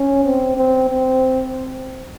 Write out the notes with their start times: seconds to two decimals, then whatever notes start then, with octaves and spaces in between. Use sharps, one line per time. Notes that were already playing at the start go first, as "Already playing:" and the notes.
Already playing: C#4
0.25 C4
0.57 C4
0.89 C4